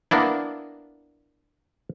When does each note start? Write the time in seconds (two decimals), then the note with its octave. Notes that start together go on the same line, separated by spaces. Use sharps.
0.11 A#3 B3 D4 E4